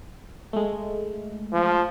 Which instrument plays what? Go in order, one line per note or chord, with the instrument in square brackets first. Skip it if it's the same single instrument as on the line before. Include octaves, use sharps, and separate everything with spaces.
[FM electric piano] G#3 A3
[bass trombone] F3